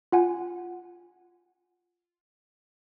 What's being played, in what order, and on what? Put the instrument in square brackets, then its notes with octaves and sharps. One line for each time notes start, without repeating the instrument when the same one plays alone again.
[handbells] F4 F#5 G#5